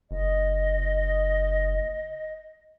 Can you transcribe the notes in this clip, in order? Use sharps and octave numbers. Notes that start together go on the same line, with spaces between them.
F#1 D#5